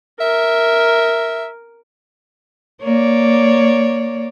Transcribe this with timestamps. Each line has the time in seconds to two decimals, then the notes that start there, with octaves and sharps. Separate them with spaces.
0.20 A#4 E5
2.83 A#3 C#5 D5